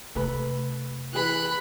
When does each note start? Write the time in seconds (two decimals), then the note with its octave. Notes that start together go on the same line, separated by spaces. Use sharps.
0.15 C3 A3 A4 B4 B5
1.13 E3 G#4 B4 B5 F#6